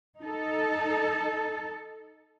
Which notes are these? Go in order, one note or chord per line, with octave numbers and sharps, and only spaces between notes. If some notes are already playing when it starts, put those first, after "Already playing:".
D#4 A4